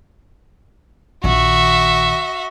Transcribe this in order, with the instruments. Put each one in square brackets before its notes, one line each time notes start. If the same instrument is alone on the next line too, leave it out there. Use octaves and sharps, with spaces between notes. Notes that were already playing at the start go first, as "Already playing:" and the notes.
[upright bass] A#1 D#3 [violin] F#4 E5